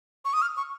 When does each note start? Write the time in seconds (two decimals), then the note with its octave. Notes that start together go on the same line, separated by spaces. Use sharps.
0.25 C#6
0.33 D#6
0.42 F6
0.57 C#6